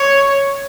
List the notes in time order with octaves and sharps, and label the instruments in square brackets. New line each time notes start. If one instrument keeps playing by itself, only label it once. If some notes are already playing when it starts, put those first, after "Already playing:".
Already playing: [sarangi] C#5